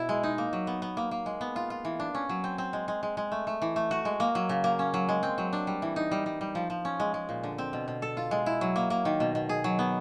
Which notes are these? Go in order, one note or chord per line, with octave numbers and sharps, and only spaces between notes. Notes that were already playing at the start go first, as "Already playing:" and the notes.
Already playing: B2 E4
G#3
D#4
A#3
F#3
B3
B3
A#3
A#3
G#3
B3
F4
F4
E3
D4
C#4
F#3
C4
C4
G#3
G#3
G#3
G#3
A3
A3
E3
A3
F#4
G#3
A#3
F#3
C#3
A#3
C#4
F#3
G#3
C4
F#3
D4
G3
E3
D#4
G3
G3
G3
F3
F3
C#4
G#3
G#3
A#2
D3
C4
B2
B2
A4
F4
G#3
E4
F#3
A#3
A#3
D#3
B2
B2
G#4
F#3
B3